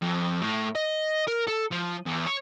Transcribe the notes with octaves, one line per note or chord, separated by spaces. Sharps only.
F2
A2
D#5
A#4
A4
F3
E2
C#5